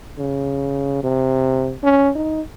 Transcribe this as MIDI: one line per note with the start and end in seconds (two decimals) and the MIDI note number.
0.18 1.03 49
1.03 1.73 48
1.84 2.10 61
2.15 2.41 63